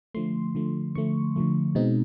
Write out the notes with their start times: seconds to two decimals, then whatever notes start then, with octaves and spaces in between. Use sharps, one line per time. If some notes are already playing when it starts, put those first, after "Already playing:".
0.14 D3 F3 A3 C6
0.55 D3 F3 A3
0.95 D3 F3 A3 C#6
1.36 D3 F3 A3
1.75 B2 G#3 C4 D#4